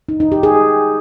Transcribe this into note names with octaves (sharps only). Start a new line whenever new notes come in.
D#4
D#4
G4
G#4